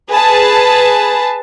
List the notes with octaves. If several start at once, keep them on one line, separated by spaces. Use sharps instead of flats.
G#4 B4 A5